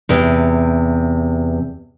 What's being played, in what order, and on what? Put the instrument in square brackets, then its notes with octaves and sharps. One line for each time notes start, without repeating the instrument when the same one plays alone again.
[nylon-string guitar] E2 C3